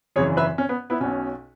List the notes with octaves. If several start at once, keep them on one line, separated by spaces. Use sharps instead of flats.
G#1 F#2 C#3 E3 G#4 C#5
B4 E5
C#4
B3
B3 E4
B1 B2 C#4